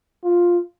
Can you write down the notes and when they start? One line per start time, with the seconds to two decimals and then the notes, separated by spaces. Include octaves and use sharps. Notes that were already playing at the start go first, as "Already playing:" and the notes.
0.24 F4